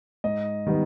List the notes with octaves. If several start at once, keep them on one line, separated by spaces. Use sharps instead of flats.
G#2 D#5
D#3 G3 B3